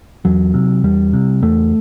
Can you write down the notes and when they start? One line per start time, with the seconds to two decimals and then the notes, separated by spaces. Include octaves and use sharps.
0.25 E2 F#3
0.54 C3
0.84 E2 G3
1.13 C3
1.42 E2 A3